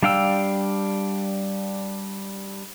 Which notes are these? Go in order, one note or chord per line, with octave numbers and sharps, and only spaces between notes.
G3 D4 F5 G5 E6